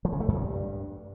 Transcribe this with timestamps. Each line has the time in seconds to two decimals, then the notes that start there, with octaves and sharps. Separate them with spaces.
0.05 F3
0.13 C#3
0.20 A3
0.28 F#2
0.36 G2